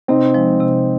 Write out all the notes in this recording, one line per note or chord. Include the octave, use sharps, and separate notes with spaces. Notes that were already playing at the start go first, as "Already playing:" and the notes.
C3 C4 D#4
F3 G#3
C3